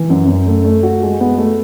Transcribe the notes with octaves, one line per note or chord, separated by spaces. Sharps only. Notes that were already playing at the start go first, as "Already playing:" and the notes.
Already playing: E3
F#2
F#2
A3
A3
F#4
G#3
B3
A3